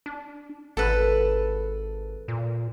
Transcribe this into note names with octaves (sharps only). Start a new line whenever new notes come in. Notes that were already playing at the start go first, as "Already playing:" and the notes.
D4
G#1 A4 B4
A#2